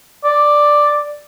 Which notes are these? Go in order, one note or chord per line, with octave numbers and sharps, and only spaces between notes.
D5